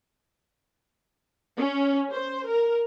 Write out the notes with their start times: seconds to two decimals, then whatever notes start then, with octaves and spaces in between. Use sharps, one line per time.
1.58 C#4
2.13 C5
2.49 A#4